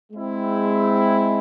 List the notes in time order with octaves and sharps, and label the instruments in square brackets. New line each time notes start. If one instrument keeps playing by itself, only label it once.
[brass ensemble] G#3 C4 E4